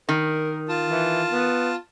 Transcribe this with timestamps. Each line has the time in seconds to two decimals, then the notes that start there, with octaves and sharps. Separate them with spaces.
0.09 D#3 A#4
0.69 F4 A5
0.89 E3
1.32 B3